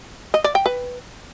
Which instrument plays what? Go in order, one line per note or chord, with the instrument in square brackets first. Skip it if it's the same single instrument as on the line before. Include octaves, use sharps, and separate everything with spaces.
[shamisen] D#5
D5
G5
B4